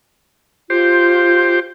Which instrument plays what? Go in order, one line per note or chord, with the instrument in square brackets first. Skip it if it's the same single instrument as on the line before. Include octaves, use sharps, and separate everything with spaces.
[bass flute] F4 [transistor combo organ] G4 C5